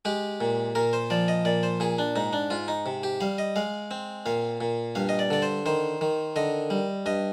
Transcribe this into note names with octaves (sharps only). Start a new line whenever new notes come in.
G#3 G4
A#2
A#2 A#4
C5
F3 D5
D#5
A#2 D5
C5
A#2 G#4
D4
G#2 D#4
D4
G#2 F4
D#4
C3
G4
G3 F5
D#5
G#3 F5
C4
A#2 F5
A#2
G2 F5
D#5
D5
D3 D5
C5
D#3 C5
D#3
D3 D#5
G3
G2 D#5